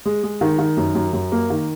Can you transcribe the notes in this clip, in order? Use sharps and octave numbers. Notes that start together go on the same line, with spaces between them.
G#3
G#3
D#3
D#3
F#2
F#2
F#2
A#3
D#3